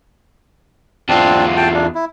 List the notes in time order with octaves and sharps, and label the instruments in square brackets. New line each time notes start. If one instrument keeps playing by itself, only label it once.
[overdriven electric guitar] E2 F4 [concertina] C4 D4 A5
[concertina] G5 A5
D4
E4